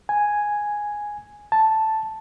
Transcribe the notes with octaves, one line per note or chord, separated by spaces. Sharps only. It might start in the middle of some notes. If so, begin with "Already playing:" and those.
G#5
A5